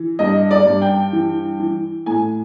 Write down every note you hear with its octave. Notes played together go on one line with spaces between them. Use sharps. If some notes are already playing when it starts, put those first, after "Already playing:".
Already playing: E3
G2 D#5
D5
G2
G5
E3
E3
A2 G#5